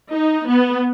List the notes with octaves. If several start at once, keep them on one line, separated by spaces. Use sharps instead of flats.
D#4
B3